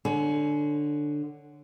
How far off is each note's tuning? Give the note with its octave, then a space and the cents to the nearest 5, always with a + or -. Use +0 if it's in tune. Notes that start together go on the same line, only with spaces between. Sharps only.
D3 +10 C#5 +0 G#5 +35